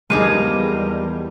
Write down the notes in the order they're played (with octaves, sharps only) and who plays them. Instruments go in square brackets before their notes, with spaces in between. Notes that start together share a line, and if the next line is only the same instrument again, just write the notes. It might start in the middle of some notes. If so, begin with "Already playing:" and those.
[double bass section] E2 G3 [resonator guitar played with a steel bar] F3 A#3 D#4 [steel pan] G#3 G#4 [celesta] D#7